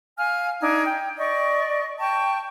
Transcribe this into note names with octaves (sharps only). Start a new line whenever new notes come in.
F5 G#5 F6
D4 D#4 G#6
G5
D5 D#5 C#6
G5 A5 C#6